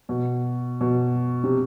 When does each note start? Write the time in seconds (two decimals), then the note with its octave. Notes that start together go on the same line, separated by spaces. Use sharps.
0.09 B2
0.81 B2
1.44 C3